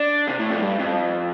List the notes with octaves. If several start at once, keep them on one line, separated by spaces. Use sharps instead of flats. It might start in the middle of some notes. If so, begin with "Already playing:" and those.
Already playing: D4
C3
A2
F2
A2
G2
F2